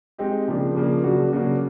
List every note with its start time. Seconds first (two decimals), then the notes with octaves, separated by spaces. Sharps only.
0.18 G#3 C4 D#4 G4
0.47 C#3 F3 A#3 D4
0.75 C#3 F3 A#3 D4
1.04 C#3 F#3 A#3 D4 F#4
1.32 C#3 F#3 A#3 D4 F#4